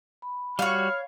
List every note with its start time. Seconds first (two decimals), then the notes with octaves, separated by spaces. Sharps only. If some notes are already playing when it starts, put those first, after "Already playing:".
0.22 B5
0.59 G3 F#4 C#5 F5 F6